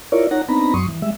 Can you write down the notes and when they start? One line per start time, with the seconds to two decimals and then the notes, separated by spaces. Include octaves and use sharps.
0.12 E4 F4 A#4 C#5 D5
0.31 D#4 C#5 F#5 A#5
0.48 B3 C4 D4 D#4 A#5 B5
0.74 F#2 F#3 C6 C#6 D#6
0.88 E3
1.02 G3 G#3 E5